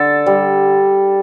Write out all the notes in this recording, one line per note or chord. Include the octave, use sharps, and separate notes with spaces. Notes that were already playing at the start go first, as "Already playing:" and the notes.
Already playing: D3 A4
G3